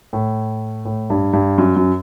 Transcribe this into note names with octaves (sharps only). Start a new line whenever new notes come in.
A2
A2
G2
G2
F#2
F#2